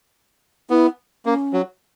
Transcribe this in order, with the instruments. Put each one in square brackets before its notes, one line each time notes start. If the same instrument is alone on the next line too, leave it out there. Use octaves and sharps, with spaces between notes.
[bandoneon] B3 [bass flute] E4
[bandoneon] A#3 [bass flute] C#4
[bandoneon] F#3